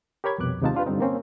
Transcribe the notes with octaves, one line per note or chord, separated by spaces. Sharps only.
G4 A#4 C#5 B5 G#6
C2 F2 B2 D6 F#6
D#2 C3 G#3 D#4 F4 A5
D4 F4 G4 B4
G2 D3 G3 C4 D#4
A#3 C4 C#4